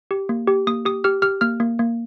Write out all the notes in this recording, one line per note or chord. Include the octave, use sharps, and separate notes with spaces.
G4
A#3
G4
A#3 D#6
G4 D#6
G4 F6
G4 F6
A#3 F6
A#3
A#3